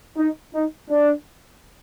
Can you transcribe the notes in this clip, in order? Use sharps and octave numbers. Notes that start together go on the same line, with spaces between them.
D#4
D#4
D4